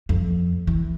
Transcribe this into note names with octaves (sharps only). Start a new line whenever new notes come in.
F2
E3